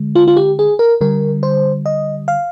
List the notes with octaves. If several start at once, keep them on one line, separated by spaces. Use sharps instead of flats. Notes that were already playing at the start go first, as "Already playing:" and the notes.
Already playing: D3 G#3
F4
F4
G4
G#4
A#4
D3 G3 A#4
C5
D#5
F5